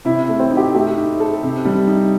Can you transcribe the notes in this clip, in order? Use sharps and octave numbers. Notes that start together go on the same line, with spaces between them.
C3 E4
A3
C4
D#4
G4
A3 G4
D#4
A4
C3
G3
D#4